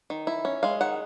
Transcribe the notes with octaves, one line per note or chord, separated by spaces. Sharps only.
D#3
E4
C#4
G#3 F5
D#3 F#5